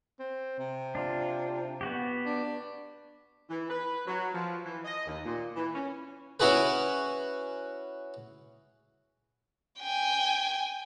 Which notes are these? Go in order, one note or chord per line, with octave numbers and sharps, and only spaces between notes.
C4
C3
D4 F4
B3 F#4 G4
D4
E3
B4
F#3
F3
E3
D#5
D#2
A#2
E3
C#4
C#4 E4 F#4 G#4 B4
G5 G#5